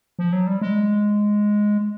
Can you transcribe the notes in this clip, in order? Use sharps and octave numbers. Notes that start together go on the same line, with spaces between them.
F3
F#3
G3
G#3